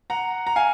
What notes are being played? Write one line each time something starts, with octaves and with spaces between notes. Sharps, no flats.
F#5 A#5
A#5
F5 G#5